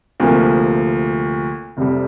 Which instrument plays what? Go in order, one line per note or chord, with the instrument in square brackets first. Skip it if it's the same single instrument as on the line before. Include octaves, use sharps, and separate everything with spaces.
[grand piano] D2 C3 F3 A#3
F1 F2 C3 G3